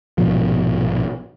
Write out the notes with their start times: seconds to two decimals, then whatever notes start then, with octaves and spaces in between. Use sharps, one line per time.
0.18 A#1 G#2 B2 F3